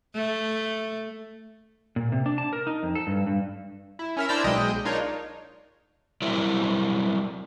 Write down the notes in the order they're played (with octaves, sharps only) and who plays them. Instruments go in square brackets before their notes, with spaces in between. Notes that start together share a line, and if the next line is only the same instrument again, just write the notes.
[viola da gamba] A3
[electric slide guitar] A#2
C3
D4
A5
A#4
D#4
F2
A4
G2
G2
[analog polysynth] E4
C#4 A#4 E5
D4 E4 C5 D5 A#5 E6
B1 G#3 D#5 G5
D4 D#4 F4 A#4 C#5
[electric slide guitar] F#3 G3 C4 E4 A#4